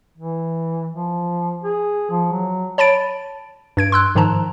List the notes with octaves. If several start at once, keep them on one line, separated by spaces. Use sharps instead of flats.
E3
F3
G#4
F3
F#3
C#5 A5 B5 A6 D7
G2 G#6 D7
C6 E6 F#6
G#2 D#3 F3 A5 A#5